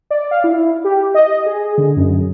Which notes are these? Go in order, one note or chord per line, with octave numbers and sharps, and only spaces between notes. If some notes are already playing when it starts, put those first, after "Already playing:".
D5
F5
E4
G4
D#5
G#4
D3
F#2